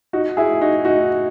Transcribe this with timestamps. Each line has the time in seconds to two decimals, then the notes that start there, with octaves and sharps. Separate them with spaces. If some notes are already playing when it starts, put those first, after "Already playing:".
0.13 D#4 F#4
0.37 E4 G#4
0.61 D#4 F#4
0.85 D#4 F#4